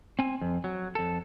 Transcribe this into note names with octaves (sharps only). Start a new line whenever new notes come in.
C4 G#5
F2
F#3
F2 A4